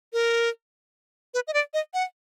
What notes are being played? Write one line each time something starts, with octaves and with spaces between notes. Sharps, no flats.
A#4
B4
D#5
D5
D#5
F#5